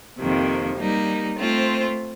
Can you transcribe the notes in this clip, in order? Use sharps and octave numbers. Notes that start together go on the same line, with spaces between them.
F2 C3 D#3 A#3
G3 A#3 D#4
A3 C4 F4 C5